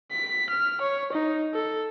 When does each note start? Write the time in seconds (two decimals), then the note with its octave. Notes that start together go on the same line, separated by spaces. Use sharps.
0.12 B6
0.49 F6
0.81 C#5
1.13 D#4
1.54 A4